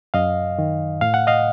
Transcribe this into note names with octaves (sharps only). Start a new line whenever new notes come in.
F#2 D#5 F5
D#3
A2 F5
F#5
D#5 F5